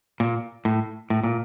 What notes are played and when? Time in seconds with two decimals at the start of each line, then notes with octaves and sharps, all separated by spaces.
0.20 A#2
0.65 A2
1.10 A2
1.23 A#2